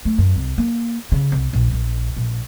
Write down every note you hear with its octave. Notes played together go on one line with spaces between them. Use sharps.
A3
F#2
C2
A#3
C#3
C2
A#1
A#1
A#1